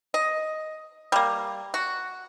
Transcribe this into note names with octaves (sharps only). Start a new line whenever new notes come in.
D#5
G3 A#3
F#4